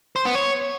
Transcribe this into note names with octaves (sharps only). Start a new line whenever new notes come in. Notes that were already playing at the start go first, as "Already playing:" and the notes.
C5
B3
C#5